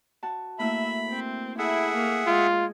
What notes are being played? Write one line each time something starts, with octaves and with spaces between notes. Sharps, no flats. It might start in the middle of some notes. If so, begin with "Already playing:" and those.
F#4 A5
A3 A#3 E4 E5 B5
C4
E4 G#4 A4 E5 F#5
A#3
G#3 F4